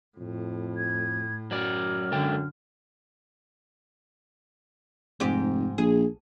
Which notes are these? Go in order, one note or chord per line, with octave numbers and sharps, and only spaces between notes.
F2 A2
G#6
F#2 F#3 D5 F6
G#2 D3 A4 G5
F1 G#2 G4
A#1 G#4